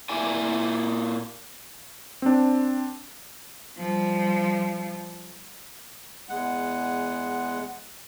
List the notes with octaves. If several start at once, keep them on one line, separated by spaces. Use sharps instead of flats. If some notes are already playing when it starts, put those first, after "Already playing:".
A#2 E4 D5 G#5
C4 D4
F3 G3
E2 G#3 F#5